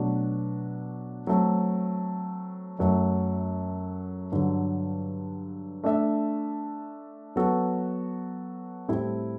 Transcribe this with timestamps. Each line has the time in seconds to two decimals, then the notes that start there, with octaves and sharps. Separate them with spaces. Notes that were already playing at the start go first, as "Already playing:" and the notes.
Already playing: B2 F#3 A3 D4 F#4
1.27 F#3 A3 C4
2.79 F#2 F#3 A3
4.32 G2 D3 F#3
5.84 A3 D4 A4 E5
7.36 F#3 B3 F#4 A4
8.89 A2 G3 C4 E4 A4